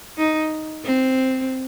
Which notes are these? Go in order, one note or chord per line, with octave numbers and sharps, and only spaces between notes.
D#4
C4